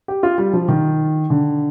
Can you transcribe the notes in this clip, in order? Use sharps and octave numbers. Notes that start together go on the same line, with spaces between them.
G4
F4
G3
F3
D#3
D3